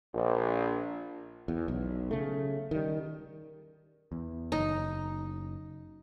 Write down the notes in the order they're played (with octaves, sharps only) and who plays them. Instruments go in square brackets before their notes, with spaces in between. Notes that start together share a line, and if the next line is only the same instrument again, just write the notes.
[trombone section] A#1
[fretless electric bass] E2
B1
C#3 A3
D#3 G3
[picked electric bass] E2
[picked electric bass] F#1 [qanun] D#4